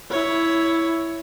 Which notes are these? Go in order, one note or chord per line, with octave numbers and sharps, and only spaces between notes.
E4 C#5